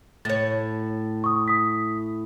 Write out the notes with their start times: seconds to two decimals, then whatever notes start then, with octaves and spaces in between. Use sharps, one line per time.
0.25 A2 C#5 A6
1.24 C#6 D#6
1.48 D#6 B6